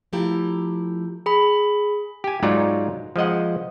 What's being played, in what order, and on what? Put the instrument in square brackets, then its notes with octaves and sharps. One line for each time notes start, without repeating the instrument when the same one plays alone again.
[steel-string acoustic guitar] F3 A3 E4 G4 A#5
[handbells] G#4 B5
[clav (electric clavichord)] G4 G#5
G#2 F#3 D#4 F4 C#5 D5
F3 G#3 D#5 F#5